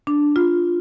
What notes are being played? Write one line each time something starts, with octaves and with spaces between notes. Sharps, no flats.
D4
F4